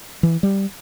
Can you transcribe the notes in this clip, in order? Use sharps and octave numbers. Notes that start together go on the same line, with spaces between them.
E3
G3